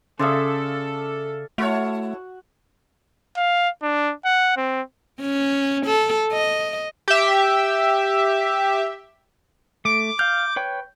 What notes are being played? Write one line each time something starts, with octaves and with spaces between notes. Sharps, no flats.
C#3 A4 D5 E5 F5 C6 D#6
A3 E4 F#4 A4 C#5 F#5
F5
D4
F#5
C4
C#4
A4
D#5
G4 E5
A3 D6
F5 F6 G6
B4 C#5 G5